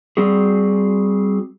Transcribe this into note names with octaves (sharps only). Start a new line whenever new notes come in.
G3 C4 F#4 G#4